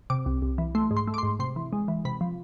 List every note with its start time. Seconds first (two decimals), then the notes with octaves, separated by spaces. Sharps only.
0.10 C3 D6
0.26 C2
0.42 C2
0.58 E3
0.75 A3 C6
0.91 G#2
0.97 C6
1.08 A3
1.14 D6
1.18 C6
1.23 G#2
1.39 C3 C6
1.56 E3
1.73 G#3
1.88 E3
2.05 C3 B5
2.21 F3